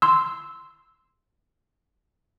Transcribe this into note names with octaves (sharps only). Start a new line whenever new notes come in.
C6 E6